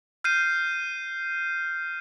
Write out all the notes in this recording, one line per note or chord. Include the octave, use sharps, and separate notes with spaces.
F6 G6 C7 D#7